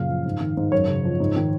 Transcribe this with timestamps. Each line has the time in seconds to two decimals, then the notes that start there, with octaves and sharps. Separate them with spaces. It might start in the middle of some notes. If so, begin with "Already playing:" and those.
Already playing: F#2 A#2 C#3 F5
0.09 F3
0.26 G#2
0.40 D#3
0.57 G#2
0.72 F#2 C#5
0.88 C#3
1.04 F3
1.20 G#2
1.36 D#3